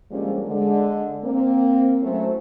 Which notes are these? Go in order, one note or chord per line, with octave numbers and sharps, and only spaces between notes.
D3 F3 G3 G#3 A#3 C#4
D3 G#3
A#3 C4
F#3 A3 C#4 E4 C5